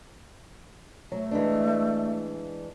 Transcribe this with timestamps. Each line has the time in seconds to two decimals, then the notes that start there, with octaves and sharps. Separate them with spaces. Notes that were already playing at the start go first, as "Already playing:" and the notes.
1.12 F#3 A3
1.31 E3 G#3 D4